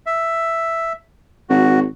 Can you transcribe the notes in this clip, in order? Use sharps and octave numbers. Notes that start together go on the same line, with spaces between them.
E5
G#1 F#4